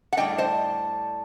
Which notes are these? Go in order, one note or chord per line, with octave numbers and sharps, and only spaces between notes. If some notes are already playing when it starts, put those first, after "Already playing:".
F#5
A2 G3 D4 D#5 G5
C5 D#5